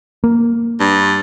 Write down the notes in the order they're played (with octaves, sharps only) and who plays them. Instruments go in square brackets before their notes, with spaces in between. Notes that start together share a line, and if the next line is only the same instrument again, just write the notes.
[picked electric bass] A#3
[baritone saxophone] G2